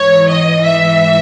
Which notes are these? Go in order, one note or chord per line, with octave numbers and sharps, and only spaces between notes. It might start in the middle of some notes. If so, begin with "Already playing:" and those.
Already playing: G#2 E3 C#5
D#5
E5